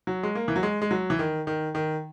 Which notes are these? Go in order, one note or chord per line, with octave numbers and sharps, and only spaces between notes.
F#3
G#3
A#3
E3
F#3
G#3
G#3
F#3
E3
D#3
D#3
D#3